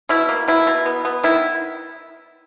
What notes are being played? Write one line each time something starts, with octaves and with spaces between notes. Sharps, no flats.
B2 E4
A#3
B2 E4
B2
B3
B3
D#3 E4